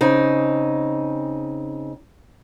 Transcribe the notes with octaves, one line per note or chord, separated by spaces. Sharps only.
C#3 C4 D#4